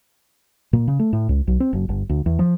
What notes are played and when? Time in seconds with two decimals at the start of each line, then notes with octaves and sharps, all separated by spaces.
0.73 A#2
0.88 C#3
0.99 A3
1.13 A2
1.29 C#2
1.47 B1
1.60 C4
1.73 F#1
1.89 G1
2.09 D2
2.26 E2
2.39 F3